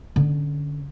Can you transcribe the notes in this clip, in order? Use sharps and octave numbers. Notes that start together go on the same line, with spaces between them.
D3 C#4